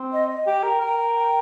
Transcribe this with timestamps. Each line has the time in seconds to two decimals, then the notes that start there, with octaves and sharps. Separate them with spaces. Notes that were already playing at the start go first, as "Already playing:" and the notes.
Already playing: C4
0.11 D#5
0.29 D#5
0.46 G4 G5
0.63 A#4 G5
0.81 A#4 G5
0.98 G5
1.16 G5